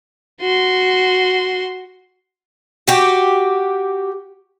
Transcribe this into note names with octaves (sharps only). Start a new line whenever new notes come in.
F#4 C6
F#4 G4